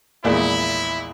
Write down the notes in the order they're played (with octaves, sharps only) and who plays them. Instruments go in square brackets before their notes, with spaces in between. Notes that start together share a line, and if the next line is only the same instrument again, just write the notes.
[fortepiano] A#1 E2 G#3 [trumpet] E4